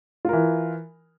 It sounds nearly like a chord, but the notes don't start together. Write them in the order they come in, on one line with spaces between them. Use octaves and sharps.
F4 A#4 E3